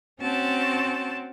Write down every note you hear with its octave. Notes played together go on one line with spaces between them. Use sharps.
C4 C#4 F#4 A5